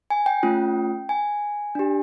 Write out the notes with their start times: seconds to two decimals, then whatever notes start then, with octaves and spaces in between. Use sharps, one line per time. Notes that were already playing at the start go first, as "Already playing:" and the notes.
0.10 G#5
0.26 G5
0.43 A3 C#4 F4
1.09 G#5
1.75 D4 G4